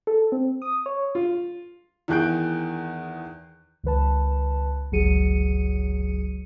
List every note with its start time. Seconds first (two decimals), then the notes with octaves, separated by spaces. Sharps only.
0.07 A4
0.32 C4
0.62 D#6
0.86 C#5
1.15 F4
2.08 E2 D#3 G#4 F#6 G6 D7
3.84 C#2 D#3 B4 A5
4.92 G1 C#2 F#3 G#4 C#7 D#7